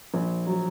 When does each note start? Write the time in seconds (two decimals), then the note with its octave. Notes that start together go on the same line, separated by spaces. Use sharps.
0.14 A#1
0.47 F#3